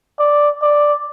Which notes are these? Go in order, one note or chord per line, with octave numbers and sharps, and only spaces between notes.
D5
D5